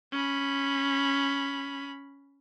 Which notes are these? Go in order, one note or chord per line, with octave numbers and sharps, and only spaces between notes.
C#4 B5